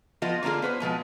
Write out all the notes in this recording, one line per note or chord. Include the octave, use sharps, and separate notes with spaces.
F3 B3 F4 D#5
D3 A#3 D4 F4 G#4
B3 B4 C5
B2 F3 G#3 B3